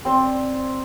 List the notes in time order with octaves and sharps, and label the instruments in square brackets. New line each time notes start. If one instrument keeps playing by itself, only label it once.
[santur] C4 C5 D5